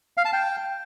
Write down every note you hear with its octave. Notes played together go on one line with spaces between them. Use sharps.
F5
A5
G5